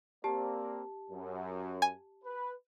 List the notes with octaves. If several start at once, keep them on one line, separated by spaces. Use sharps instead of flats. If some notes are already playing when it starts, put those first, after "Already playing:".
A#3 C4 G4 D5 A5
F#2
G#5
B4